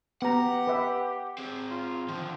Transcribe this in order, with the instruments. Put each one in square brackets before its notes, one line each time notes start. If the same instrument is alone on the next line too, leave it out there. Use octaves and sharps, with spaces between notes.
[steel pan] B3 A#5 [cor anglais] G4 [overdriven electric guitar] F#5
[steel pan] B4 E5
[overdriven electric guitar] C4 G#4
[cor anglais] F4
[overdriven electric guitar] D3 D#3 [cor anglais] F3